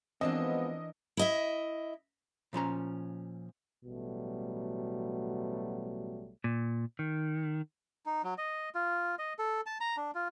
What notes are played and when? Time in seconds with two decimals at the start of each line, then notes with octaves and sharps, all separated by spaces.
0.21 E3 F3 G#3 B3 C4 D4 A#4 D#5
1.17 E4 D#5 E5
2.53 A#2 F3 C#4 A#5
3.85 A1 B2 F#3 G3 A3
6.44 A#2
6.99 D#3
8.06 D#4
8.24 F#3
8.38 D#5
8.75 F4
9.19 D#5
9.39 A4
9.66 A5
9.81 A#5
9.97 D4
10.15 F4